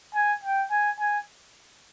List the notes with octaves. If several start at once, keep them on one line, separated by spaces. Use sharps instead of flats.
G#5
G5
G#5
G#5